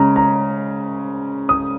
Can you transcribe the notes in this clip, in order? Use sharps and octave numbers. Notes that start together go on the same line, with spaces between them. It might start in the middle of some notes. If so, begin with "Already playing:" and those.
Already playing: C#3 G#3 C#4 A#5
A#5
D#6